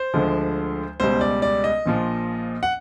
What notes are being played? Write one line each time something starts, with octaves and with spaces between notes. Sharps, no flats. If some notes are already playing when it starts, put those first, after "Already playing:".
Already playing: C5
D2 D3 F3 G#3
C#2 B2 G3 C5
D5
D5
D#5
A#1 A#2 F3
F#5